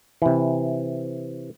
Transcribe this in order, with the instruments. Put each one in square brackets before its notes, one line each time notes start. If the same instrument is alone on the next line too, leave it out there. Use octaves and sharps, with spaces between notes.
[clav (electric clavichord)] C3 E3